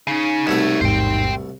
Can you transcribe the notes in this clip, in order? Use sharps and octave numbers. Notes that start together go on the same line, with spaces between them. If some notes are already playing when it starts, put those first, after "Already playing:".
C#3 C#4 D#4
C2 B2 A3 C#5 E5
A1 E2 G#2 C5 G5